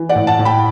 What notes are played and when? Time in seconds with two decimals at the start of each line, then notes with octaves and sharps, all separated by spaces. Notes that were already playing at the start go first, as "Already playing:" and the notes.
Already playing: E3
0.09 D5 F#5
0.16 A2
0.27 F#5 A5
0.39 A2
0.45 G5 B5